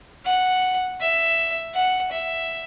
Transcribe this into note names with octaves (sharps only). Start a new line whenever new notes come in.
F#5
E5
F#5
E5